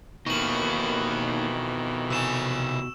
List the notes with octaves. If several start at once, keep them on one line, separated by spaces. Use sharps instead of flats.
F2 B2 D#3 E3 A#3 D#4 C#6 F#7
C3 C5 G#5 E6 E7